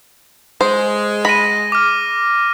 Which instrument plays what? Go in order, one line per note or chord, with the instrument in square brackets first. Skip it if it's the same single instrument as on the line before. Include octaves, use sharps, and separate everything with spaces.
[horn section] G#3 [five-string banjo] C5
[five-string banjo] B5 [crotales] A#6 D#7
[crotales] D6 F6